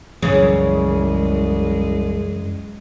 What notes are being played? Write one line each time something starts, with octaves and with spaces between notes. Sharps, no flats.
C2 F#2 C#3 E3 G#3